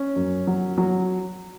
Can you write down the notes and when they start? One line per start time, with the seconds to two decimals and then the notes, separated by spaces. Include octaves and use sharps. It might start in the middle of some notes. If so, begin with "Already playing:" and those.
Already playing: C#4
0.16 F#2
0.47 F#3
0.78 F#3